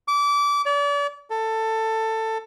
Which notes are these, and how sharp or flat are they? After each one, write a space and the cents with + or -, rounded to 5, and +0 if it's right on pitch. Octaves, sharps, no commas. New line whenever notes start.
D6 -25
D5 -40
A4 +15